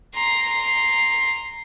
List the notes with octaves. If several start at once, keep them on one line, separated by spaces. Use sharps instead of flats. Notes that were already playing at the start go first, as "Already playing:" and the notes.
A#5 C6